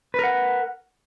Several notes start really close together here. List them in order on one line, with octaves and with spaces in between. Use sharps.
B4 A#4 F#5